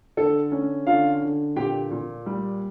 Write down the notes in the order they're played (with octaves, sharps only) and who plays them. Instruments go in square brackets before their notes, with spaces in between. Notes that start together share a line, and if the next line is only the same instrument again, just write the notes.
[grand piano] D3 A4
C#4
D3 F4 F5
D3
A#2 G4 G5
A#2
G3